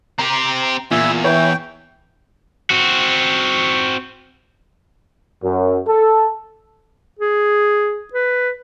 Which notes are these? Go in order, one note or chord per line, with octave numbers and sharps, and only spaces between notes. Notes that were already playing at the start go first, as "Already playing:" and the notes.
C4 G4 A#5
E2 A#2 E5 G#5
E3 C#5 G5
C4 F#4
F#2
A4
G#4
B4